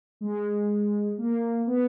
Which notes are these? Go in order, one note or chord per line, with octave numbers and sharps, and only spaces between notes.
G#3
A#3
B3